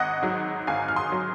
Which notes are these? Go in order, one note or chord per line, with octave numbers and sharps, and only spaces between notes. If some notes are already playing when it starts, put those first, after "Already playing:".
Already playing: G#1 D#5 F#5
G#2 F#3
G#1 F5 G#5
F6
C6 D#6
F#3